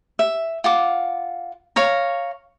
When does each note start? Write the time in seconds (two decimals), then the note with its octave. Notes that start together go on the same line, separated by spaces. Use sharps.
0.19 E5
0.64 F4 F#5 D6
1.76 C#5 F5 A#5